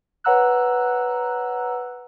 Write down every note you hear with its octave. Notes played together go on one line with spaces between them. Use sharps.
B4 C#5 F#5 A#5 E6 F#6